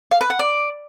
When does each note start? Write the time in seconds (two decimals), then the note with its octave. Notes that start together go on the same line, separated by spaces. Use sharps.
0.11 F5
0.21 B4
0.30 F#5
0.39 D5